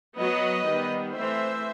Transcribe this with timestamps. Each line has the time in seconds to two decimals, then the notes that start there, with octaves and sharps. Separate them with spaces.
0.18 F#3 B3 B4 D#5
0.67 D#3 G3 B3
1.15 E3 A3 C4 C5 E5